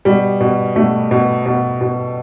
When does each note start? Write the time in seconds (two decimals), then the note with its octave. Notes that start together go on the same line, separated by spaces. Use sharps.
0.05 B2 G3
0.41 B2
0.76 B2 A3
1.11 B2
1.46 B2
1.81 B2